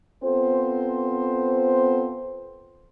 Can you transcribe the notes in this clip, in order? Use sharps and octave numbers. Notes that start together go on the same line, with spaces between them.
B3 C4 F4 A4 C5